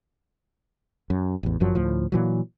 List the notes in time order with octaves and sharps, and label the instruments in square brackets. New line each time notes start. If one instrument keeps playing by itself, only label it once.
[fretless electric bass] F#2
A1 E2
G1 F#2 F3 F#3
D2 A2 F3
A#2 E3 F#3